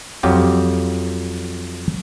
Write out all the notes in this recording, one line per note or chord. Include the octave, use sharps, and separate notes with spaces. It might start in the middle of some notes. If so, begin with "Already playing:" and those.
F2 F#3 F4 G4